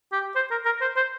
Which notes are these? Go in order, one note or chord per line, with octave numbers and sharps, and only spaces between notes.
G4
C5
A#4
A#4
C5
C5